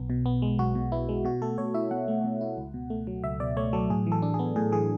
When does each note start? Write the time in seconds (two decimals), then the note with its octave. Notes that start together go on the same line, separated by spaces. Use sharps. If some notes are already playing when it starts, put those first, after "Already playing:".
Already playing: B1 B3
0.10 B2
0.26 B3
0.42 G#3
0.59 B1 F#4
0.75 B2
0.92 B3 E4
1.09 G#3
1.25 B2 F#4
1.42 A3 A4
1.58 B2 C#5
1.74 E4 E5
1.91 B2 F#5
2.08 A3
2.24 B2
2.41 E4
2.57 C#2
2.74 B2
2.90 A3
3.07 F#3
3.24 C#2 E5
3.40 B2 D5
3.57 A3 C#5
3.73 F#3 A4
3.90 A2 G#4
4.07 E3
4.12 A4
4.22 D4
4.34 G#4
4.39 B3
4.56 A2 G#4
4.72 E3 G#4